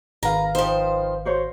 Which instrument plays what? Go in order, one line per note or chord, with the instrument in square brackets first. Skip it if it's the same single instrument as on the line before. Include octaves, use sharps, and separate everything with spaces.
[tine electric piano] G#1 [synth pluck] B4 F5 [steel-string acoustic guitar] A#5
[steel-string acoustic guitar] F3 C5 [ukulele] D#4 G5
[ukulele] F#4 C5 C#5